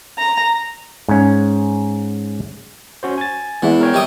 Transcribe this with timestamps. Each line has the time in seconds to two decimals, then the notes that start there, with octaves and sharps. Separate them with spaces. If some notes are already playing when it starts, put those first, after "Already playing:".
0.18 A#5
1.08 G#2 C#4
3.03 C#4 F#4 C5
3.18 G#5 A6
3.62 E2 E3 G#3 F#5
3.81 A#4 C#5 G5
3.93 C3 G3 D#6